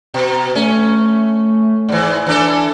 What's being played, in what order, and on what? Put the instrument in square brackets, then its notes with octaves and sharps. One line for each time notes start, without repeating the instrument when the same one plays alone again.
[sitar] B2 [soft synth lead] A#5
[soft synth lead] A3 [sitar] C#4
[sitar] G#2 E3 [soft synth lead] D5
[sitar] E3 D4 A4